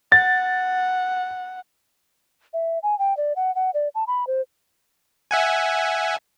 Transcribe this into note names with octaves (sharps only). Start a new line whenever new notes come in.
F#5 A6
E5
G#5
G5
D5
F#5
F#5
D5
A5
B5
C5
E5 F#5 G#5